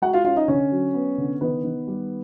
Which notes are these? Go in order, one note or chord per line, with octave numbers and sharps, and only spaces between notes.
G#3 F#4 F#5
F4 F5
C#4 F4 F5
D#4 D#5
D3 C#4 C#5
F#3
B3
D3
D#3 B3 B4
D#3
G3